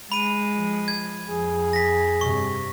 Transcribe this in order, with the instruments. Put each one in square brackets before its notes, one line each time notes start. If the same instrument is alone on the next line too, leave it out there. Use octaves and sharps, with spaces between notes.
[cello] G#3 [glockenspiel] B5 D#7
[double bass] F3
[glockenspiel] G#6
[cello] F2 [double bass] F3 [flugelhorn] G#4
[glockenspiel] A#6 B6
[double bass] G2 C3 [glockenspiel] C#6